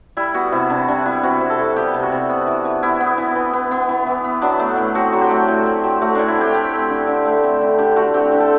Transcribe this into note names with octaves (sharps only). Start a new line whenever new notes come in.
G3 E4
B3 F#4
C3 E4
C3 D4
G3 D4
B3 E4
C3 F#4
C3
A4
G3
B3 G4
C3
F#4
C3
B3
E3
E3
B3 E4
B3
E3
E3
B3
B3
E3
E3
B3
F#3 D4
A3
A2
C4 F#4
F#3
G4
A3
A2
C4
F#3
A3 F#4
A2 D4
E4
C4 G4
A3
C4
D3
D3
A3
C4
D3
D3 G4
A3 F#4
C4 G4
D3
A4